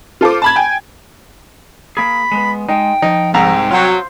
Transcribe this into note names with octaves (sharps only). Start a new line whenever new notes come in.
F4 A4 C5 D6
A5 B5 G#6
G5 G#5
A#3 G#4 B5
G#3 B3
G#3 D#4 G5
F3 D#4
C2 G#2 G5 A#5
F#3 F4 C5